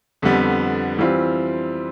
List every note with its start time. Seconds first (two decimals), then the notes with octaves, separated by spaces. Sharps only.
0.22 F2 D3 G3 B3
0.99 E3 G3 C4 F4